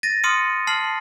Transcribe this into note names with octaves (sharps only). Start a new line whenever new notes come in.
A6 A#6 D#7
C6 D#6 F6 C#7 D#7
A5 F6 C7 F#7